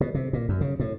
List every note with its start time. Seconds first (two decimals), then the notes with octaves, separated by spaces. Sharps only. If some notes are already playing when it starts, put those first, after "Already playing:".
0.01 B2
0.15 C3
0.33 A#2
0.49 F#2
0.61 C#3
0.79 A2